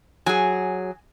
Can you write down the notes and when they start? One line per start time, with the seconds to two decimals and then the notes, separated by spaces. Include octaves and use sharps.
0.26 F#3 G#4 G#5